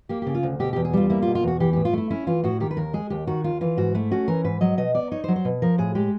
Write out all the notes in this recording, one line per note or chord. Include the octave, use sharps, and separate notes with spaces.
A#3 G4
C#3 G4
F4
D2
B2 G4
E2 G4
G#4
G3 F4
A#3 E4
F4
B2
F4
E2 F#4
E3 G4
A2 G4
F4
A3 E4
C#4 E4
E3 F4
A2 F#4
D#3 G4
B4
D#2 A#4
G#3 G#4
D#2 G4
D#3 F#4
D#2 F4
E3 F4
G#2 F#4
A3 E4
C#4 F#4
E3 A#4
G#2 B4
F#3 D#5
B2 D#5
B3 D5
D#4 C#5
C5
F#3
C5
B2
F3 A#4
A2 G#4
G#3 G4